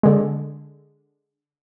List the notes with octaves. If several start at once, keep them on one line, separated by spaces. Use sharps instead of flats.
D3 G#3